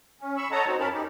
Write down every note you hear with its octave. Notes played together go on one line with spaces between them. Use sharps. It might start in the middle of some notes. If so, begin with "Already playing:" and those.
C#4
B5 C#6 E6
A4 C#5 D#5 F#5 A5 A#5
C4 D#4 F#4
F2 C#4 A#4 A5 B5
D#4 G4